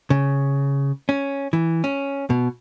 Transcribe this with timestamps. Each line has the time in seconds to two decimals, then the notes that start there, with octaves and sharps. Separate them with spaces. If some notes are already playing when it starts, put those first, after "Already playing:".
0.10 C#3
1.09 C#4
1.53 E3
1.84 C#4
2.30 B2